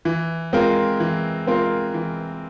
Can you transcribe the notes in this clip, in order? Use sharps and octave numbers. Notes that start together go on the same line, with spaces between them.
E3
G#3 C4 F4 A#4
E3
G#3 C4 F4 A#4
E3